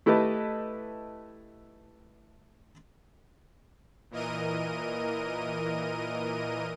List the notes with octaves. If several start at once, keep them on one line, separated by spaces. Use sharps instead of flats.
A3 E4 G4 B4 D#5 A5
A#2 E3 A#4 D#5 D#7